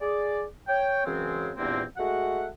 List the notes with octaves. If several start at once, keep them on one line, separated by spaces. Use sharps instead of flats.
G#4 D5
C#5 G5
F#2 C#3 E3 G#3 C4
E2 G2 A#2 A#3 C4
G#3 A3 F#4 F#5